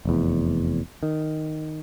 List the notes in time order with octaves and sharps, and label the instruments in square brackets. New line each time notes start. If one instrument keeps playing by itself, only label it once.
[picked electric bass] F1 E2
D#3